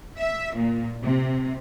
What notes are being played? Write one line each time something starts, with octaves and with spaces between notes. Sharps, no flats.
E5
A#2
C3